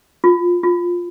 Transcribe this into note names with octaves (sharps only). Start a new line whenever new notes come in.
F4
F4